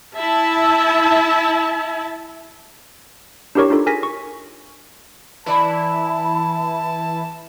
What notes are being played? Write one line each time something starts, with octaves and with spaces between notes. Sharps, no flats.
E4 E5 A5
D4 E4 G4 A#4 C#5 C#6
D4 D#4 F4 A4
G#4 A#4 G#5 A#6 B6
C#6
E3 E4 B4 D5 A5 B5